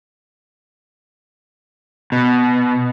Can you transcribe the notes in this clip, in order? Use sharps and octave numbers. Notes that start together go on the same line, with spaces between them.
B2